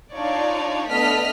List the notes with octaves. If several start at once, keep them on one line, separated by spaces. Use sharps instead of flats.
D4 D#4 F4 C#5 D5
A3 B3 D4 D#5 F6 B6